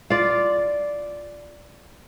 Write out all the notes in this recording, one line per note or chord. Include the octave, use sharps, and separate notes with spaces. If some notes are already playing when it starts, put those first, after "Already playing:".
F4 D5